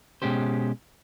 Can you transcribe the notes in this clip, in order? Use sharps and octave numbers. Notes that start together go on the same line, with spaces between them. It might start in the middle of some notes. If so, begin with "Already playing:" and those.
B2 G#3 C#4 G4 C5